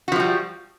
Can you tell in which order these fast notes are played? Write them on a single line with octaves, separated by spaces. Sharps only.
F#4 F3 G#3 G3